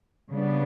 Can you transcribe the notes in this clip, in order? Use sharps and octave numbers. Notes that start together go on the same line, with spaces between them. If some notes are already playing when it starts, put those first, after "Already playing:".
C#3 G3 B3 D4